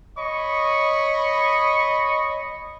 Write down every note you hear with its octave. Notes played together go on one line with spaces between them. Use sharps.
C#5 D#5 B5 C#6